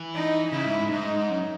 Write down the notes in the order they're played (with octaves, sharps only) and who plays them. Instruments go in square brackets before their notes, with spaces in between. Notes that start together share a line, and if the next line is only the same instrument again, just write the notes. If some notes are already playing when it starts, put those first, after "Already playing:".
Already playing: [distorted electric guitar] E3
[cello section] D#4
[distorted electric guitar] C#3 [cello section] E4
[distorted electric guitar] G#2
G#2
[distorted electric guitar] G#2 [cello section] D#4
[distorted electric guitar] F#2